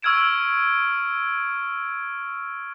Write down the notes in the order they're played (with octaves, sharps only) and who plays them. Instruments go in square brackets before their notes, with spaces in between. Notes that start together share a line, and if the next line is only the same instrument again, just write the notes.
[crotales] C#6 E6 F6 G#6 D7 E7